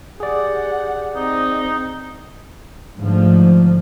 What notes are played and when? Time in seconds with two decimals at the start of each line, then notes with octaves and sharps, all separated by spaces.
0.20 G4 G#4 D5 F#5
1.16 C4 D#4 D#5
2.99 G#2 D3 F3 A3